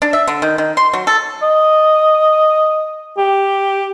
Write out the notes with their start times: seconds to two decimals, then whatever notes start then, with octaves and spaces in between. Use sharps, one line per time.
0.02 D4
0.13 E5
0.28 D3
0.42 D#3
0.58 D#3
0.77 C6
0.93 F#3
1.07 A4
1.43 D#5
3.18 G4